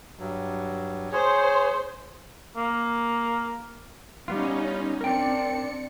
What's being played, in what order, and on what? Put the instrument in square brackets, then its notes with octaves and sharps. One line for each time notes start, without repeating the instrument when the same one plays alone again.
[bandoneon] G2 F#3
[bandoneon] G#4 C#5 [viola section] C5
[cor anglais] A#3
[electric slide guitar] G3 B3 F4 [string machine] C#4 D#4
[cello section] C4 D4 D5 [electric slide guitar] A#4 G5 [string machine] C#7